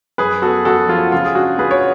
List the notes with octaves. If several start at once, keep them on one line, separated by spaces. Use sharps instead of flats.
F#2 G#4 B4
B3 F#4 A4
F#2 F#4 A4
F3 F4 G#4
C#3 F4
G#4
D4 F#4
C#3 G#4 B4
C#5